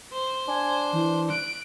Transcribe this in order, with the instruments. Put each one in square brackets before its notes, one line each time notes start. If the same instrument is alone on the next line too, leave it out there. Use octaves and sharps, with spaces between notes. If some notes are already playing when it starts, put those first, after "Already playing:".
[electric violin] C5
[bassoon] D4 [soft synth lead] G#5
[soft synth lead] E3
[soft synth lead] F#6 [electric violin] D7